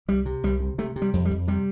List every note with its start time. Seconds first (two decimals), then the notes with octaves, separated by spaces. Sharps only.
0.08 C2 G3
0.26 C3
0.43 C2 G3
0.60 C3
0.78 C3 A3
0.96 C3
1.02 G3
1.13 F2
1.25 G3
1.31 F2
1.48 C3 G3